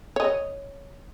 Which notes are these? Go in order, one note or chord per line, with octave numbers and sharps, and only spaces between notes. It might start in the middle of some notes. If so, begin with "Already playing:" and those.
C#5 D#5